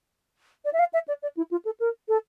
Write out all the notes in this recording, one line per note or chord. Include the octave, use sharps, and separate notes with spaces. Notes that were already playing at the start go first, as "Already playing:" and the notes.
D5
E5
F5
E5
D5
D5
E4
F4
A4
A#4
A4